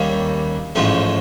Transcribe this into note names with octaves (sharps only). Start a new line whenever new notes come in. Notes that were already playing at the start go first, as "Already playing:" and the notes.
Already playing: D#2 D#3 G3 A#3 C#4
A1 G#2 F3 A3 C#4